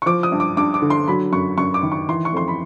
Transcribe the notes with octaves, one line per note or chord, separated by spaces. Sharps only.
C#6
F3 D6
D#6
G2
D6
G2 D6
D6
D3
C6
F#3 B5
F#2 C#6
F#2 C#6
D6
D#3
C#6
E3 C6
C#6
F2 C6
B5